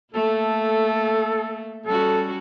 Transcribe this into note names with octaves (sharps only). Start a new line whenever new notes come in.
A3 A#3 A4
G3 C#4 F#4 A4